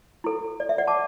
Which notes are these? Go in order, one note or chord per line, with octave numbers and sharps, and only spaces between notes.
E4 A4
D5
E5
D5 F#5
A5 D6